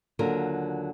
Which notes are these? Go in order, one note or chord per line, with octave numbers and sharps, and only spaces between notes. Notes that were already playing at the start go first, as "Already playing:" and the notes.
D#2 D3 F#3 F4 A#4